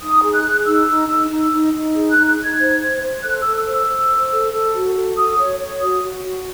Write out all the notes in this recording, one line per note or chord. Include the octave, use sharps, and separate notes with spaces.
D#4 D#6
G#4
F#6
G#4
D#4 E6
D#4
D#4
D#4
D#4
D#4
G#4
F#6
D#4
F#6
D#4
G#6
C5
C5
C5
A4 F#6
A4 E6
E6
C5
E6
C5
C5
A4
A4
F#4
A4
F#4 D#6
C#5
C#5
F#4 D#6
F#4
F#4